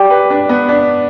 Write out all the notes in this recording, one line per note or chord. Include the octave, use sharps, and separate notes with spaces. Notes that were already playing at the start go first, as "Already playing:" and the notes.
Already playing: G4 D5 G5 D6
B4
D4
B3
D4